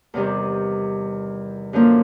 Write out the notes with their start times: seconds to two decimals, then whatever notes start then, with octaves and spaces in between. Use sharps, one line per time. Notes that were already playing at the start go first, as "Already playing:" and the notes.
0.14 E2 C3 D#3 G3
1.73 F#2 D3 F3 A#3